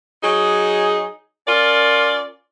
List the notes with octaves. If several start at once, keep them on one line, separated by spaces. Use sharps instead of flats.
F#3 D#4 G#4
C#4 F4 A#4 D5